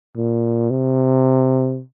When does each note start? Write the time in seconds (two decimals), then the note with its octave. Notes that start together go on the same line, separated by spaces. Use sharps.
0.17 A#2
0.71 C3